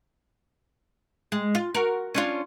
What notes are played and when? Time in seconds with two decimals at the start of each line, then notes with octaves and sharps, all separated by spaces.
1.32 G#3
1.55 F4
1.74 F#4 A#4
2.15 C#4 D4 F4